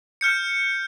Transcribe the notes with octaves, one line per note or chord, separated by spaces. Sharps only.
F6 G6 C#7